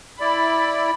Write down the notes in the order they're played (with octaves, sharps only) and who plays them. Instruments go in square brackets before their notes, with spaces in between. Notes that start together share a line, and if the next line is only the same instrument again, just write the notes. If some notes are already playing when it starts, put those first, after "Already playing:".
[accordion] E4 D5 [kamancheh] B5